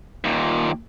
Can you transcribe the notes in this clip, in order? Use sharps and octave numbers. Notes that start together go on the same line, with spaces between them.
D#2 A#2